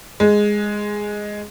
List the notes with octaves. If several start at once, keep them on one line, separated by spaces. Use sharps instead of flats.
G#3